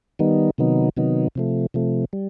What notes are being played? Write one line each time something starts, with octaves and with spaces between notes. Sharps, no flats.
D#3 G3 B3 D#4
C3 D#3 F#3 B3 D#4
C3 D#3 F#3 B3 D#4
C3 F3 A3
C3 F3 A3
G3